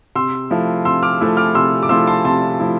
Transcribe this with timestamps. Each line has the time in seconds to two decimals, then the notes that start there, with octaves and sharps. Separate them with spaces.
0.15 C3 C6 E6
0.50 F3 A3 E4
0.85 C3 C6 E6
1.03 D6 F6
1.21 F3 A3 E4
1.37 D6 F6
1.55 C3 C6 E6
1.83 D6
1.89 F3 A3 E4 C6 E6
2.07 A5 C6
2.24 C3 A5 C6
2.60 F3 A3 E4